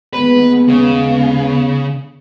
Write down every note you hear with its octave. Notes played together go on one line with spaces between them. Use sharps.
D#2 G#3 B3 B4
C#3